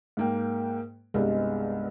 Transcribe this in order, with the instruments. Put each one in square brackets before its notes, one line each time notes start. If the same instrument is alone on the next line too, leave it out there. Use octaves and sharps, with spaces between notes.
[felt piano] G#2 A#3 G5
[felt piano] C2 G2 [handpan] G#3 B3